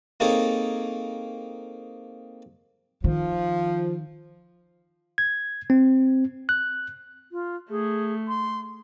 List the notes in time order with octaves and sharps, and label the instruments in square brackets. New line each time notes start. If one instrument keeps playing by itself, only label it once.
[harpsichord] A#3 C4 D#4 G#4 A4 C#5
[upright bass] D#3 [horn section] F3
[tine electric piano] G#6
C4
F#6
[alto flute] F4
[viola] A3 [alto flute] G#4
[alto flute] C6